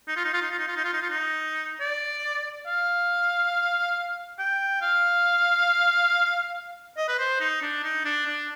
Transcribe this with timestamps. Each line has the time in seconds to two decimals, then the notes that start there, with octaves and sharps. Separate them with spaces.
0.08 D#4
0.17 F4
0.25 D#4
0.34 F4
0.42 D#4
0.51 F4
0.59 D#4
0.68 F4
0.76 D#4
0.84 F4
0.94 D#4
1.02 F4
1.10 D#4
1.80 D5
2.67 F5
4.39 G5
4.82 F5
6.97 D#5
7.08 B4
7.19 C5
7.41 D#4
7.62 D4
7.83 D#4
8.05 D4
8.26 D4